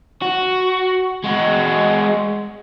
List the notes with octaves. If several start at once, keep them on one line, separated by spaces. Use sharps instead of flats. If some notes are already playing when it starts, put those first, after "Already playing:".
F#4
G#3 F#4